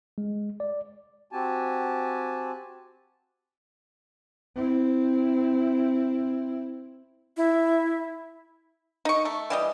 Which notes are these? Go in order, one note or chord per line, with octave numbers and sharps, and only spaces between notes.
G#3
D5
C4 F#4 G4 G#5 A5
C4 E4
E4
D#4 C#6
A3
E3 G3 D#5